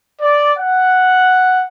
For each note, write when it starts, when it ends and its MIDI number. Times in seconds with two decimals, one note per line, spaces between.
0.21 0.54 74
0.58 1.65 78